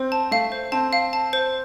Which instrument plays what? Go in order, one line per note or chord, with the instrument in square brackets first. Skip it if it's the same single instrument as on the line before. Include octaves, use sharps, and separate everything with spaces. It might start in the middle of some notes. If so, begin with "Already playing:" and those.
Already playing: [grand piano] C4 [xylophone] C5
[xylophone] A5
[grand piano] A3 [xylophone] F5
[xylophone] C5
[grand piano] C4 [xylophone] A5
[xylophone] F5
A5
C5